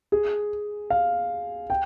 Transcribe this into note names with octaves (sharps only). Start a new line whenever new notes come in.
G#4
F5
G5